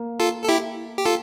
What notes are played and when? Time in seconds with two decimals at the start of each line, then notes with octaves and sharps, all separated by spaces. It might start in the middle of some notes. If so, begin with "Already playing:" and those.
Already playing: A#3
0.19 F4 A4
0.44 A4
0.49 E4 G4
0.98 G4
1.05 F4 A4